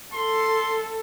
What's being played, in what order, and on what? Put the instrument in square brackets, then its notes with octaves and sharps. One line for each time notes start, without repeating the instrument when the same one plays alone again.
[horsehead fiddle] A4 [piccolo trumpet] C6